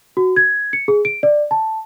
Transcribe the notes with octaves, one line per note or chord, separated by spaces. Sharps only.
F#4
G#6
C#7
G#4
D7
D5
A5